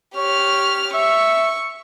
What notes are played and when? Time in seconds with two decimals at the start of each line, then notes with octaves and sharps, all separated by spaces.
0.16 G4 C#5 F6
0.94 E5 C#6